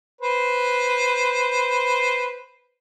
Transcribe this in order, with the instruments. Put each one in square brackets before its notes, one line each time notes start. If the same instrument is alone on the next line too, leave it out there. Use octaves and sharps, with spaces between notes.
[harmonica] B4 C5